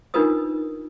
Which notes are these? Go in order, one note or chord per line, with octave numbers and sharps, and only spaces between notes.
D4 D#4 F4 A#4 B4 D#6